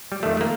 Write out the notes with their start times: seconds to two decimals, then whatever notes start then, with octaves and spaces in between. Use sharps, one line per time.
0.12 G3
0.23 F2 D#3 G3 A3
0.37 A3
0.41 A#3